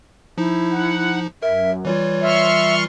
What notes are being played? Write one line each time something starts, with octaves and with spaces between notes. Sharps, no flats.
F3 D#4 E4
F#5
F#2 A#4 E5
E3 G3 F4 C#5
E5 C6 C#6 F6